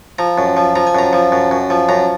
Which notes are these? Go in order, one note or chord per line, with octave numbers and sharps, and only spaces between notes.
F3 A#5
F#2
F3
F3 A#5
G#5
F#2 A#5
F3
F#2
F#2
F3
F#2 A#5